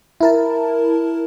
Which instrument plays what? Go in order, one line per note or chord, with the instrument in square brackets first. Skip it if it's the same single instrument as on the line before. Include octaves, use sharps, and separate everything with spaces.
[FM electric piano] E4 A#4 A5